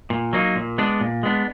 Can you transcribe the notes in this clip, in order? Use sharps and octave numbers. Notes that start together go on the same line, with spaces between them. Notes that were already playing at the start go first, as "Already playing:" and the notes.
A#2
F#3 A#3 D#4
A#2
G#3 B3 D4
A#2
G#3 B3 D4